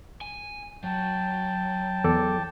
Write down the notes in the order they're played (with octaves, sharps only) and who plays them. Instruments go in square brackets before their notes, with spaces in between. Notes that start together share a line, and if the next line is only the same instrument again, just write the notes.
[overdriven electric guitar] G#5
[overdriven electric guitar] F#3 [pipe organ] G5 A5
[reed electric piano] E2 A4 D6